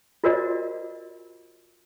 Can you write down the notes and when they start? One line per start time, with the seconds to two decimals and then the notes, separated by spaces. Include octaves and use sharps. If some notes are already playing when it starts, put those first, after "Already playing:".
0.24 F4 F#4 A#4 C5 D5 D#5